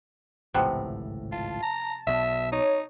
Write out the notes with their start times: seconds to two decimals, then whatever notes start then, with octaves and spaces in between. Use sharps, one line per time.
0.54 G#1 C#2 A2 C3 F3 B3
1.32 F4 A5
1.63 A#5
2.07 B1 B2 E5
2.52 D#4 C#5